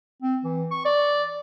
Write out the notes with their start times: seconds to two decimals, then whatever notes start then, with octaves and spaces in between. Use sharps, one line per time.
0.22 C4
0.44 E3
0.71 C#6
0.85 D5